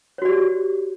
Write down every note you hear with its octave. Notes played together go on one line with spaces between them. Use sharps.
F#4 G4 C#5 D5